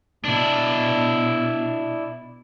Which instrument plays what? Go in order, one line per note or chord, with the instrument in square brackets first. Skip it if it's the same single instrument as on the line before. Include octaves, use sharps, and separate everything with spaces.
[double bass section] B2 [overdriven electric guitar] D4 E4